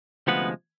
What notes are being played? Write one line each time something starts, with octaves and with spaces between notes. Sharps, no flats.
D2 C3 F3 G#3 B3 B4